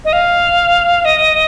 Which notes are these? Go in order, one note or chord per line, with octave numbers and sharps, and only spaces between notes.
D#5
F5
D#5